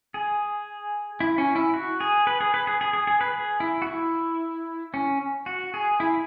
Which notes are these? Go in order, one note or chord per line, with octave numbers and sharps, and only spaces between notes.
G#4
E4
C#4
E4
F#4
G#4
B4
G#4
B4
G#4
G#4
G#4
G#4
B4
G#4
E4
F#4
E4
C#4
F#4
G#4
E4